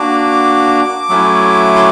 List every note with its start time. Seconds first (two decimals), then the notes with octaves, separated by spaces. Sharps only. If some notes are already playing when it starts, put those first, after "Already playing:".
Already playing: A#3 D4 F#4 D6
1.09 F#3 A3 C#4 E4
1.76 C6